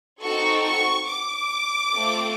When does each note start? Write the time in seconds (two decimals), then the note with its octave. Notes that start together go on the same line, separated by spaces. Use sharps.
0.22 C4 D#4 F#4 A4 C#6
0.65 C#6
1.07 D6
1.92 A3 C4 F4 A4